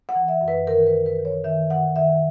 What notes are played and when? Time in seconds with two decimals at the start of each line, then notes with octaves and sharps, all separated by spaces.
0.09 F#5
0.15 E3
0.28 E5
0.41 F#2
0.48 B4
0.67 D#3 A#4
0.87 B4
0.93 D#3
1.06 B4
1.18 D#3
1.25 C#5
1.44 D#3 E5
1.70 D#3 F#5
1.96 D#3 E5